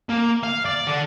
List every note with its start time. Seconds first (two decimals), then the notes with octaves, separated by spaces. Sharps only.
0.09 A#3
0.43 F5
0.65 D5
0.87 D3